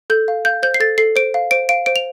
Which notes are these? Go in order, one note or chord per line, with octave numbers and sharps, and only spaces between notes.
A4 G6
F5
F5 G6
C5 G6
C7
A4 A6
A4 C7
C5 D7
F5
C5 D7
F5 D7
C5 D7
F7